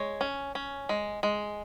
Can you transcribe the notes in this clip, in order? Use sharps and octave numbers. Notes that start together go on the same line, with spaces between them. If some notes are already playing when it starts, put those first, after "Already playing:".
Already playing: G#3 C#5
C#4
C#4
G#3
G#3